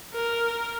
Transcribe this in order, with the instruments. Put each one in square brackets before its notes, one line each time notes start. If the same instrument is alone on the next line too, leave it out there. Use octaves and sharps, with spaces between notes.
[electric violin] A#4